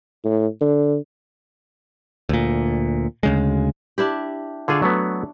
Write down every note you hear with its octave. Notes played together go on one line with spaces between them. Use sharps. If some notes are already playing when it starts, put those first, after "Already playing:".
A2
D3
D2 A#2
D2 C#3 G#3
D4 E4 G4
D3 D4 F4 G#4 C#5
F#3 A3 B3